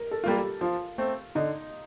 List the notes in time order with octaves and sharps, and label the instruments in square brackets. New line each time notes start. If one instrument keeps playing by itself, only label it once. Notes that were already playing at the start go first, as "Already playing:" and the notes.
Already playing: [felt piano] A#4
A4
[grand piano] G3 A#3 F4 [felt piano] A4
[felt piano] G4
[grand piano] F3 [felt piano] F4
[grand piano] A3 C4
[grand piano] D3 [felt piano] D#4